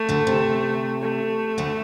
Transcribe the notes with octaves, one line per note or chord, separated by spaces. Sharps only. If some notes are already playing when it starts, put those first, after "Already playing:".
Already playing: A3
D2 D3
C3
A3
D2 D3